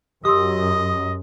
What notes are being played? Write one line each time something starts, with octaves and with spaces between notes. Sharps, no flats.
F#2 G4 D#5 C6 D#6 E6